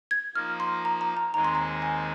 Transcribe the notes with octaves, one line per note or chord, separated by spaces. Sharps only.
G#6
F3 A#3 D#4 F6
C6
A#5
A#5
A#5
D#2 D#3 G#3 C4 D#4 A#5
C6
A#5
G#5